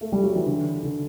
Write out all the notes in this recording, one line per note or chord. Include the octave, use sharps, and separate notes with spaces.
A3
G3
F#3
E3
D3
D3